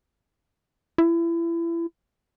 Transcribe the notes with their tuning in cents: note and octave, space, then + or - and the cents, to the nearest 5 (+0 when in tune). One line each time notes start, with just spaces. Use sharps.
E4 +30